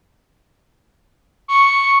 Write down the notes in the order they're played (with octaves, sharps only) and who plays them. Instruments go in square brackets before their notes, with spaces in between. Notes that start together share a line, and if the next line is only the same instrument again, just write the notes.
[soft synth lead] C#6